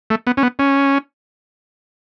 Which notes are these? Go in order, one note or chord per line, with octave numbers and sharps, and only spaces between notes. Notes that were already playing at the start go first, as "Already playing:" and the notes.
A3
B3
C#4
B3
C#4